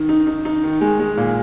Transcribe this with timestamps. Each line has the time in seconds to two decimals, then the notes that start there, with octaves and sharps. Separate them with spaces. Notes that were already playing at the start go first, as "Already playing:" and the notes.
Already playing: D#3
0.09 D#4
0.27 D#4
0.45 D#4
0.64 D#3
0.81 G#3
1.00 G#3
1.17 A#2